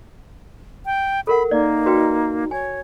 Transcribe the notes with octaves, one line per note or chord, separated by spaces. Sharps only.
G5
A4 A#4 F#5 B5
A#3 D#4 D5
F#4 B4 G5
C#5 G#5